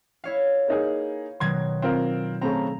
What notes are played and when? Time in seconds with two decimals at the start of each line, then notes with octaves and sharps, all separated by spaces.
0.24 E4 C#5 F5
0.68 A#3 D#4 G#4
1.40 B2 D#3 F#3 C6 G#6
1.82 C4 F4 A#4
2.41 C#3 A3 C4 A#5